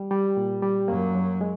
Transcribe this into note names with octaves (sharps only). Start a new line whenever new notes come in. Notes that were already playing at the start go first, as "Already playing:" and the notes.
Already playing: G3
G3
A#2
G3
F#2 A#3
F#3
G#3